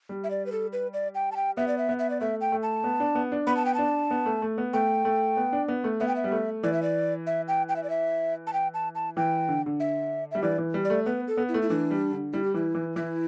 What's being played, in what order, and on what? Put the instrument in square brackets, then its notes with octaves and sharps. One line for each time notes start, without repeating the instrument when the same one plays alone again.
[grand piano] G3
[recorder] E5
D5
B4
A4
B4
D5
G5
A5
G5
[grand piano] B3 [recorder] E5
[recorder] D5
E5
[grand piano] B3
[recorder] E5
D5
[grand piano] A3 [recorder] E5
[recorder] G5
[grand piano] A3
[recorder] A5
[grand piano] B3
D4
B3
D4
[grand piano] B3 [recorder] B5
[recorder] A5
G5
[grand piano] D4 [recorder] A5
[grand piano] B3
A3
A3
B3
[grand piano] A3 [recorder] G5
[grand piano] A3
B3
D4
B3
A3
[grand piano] B3 [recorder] E5
[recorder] G5
E5
[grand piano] G3
A3
[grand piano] E3 [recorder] D5
[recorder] E5
D5
E5
G5
G5
E5
D5
E5
A5
G5
A5
A5
[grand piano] E3 [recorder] G5
[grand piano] D3
D3
[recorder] E5
[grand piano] G3 [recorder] E5
[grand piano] E3 [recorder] D5
[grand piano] E3
G3
[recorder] D5
[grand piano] A3
[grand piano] B3 [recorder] B4
[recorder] A4
[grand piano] B3
[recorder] E4
[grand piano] A3
[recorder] E4
[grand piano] E3 [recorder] D4
[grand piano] G3
D3
[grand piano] G3 [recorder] E4
[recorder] G4
[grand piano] E3 [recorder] E4
[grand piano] E3
[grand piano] E3 [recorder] E4